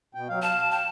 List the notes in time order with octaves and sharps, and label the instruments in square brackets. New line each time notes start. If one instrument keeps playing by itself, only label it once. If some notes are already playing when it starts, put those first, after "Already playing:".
[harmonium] B2 G5
F#3 F5
[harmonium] F5 [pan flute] A5
[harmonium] G5 [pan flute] A5